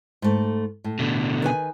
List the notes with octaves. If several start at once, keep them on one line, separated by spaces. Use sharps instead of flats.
G#2 A3
A2
B2 D3
D#3 B4 G#5